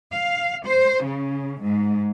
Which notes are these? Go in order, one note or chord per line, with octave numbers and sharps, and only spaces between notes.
F5
C5
C#3
G#2